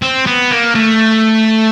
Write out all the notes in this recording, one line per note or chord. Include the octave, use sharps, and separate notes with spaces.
C4
B3
A#3
A3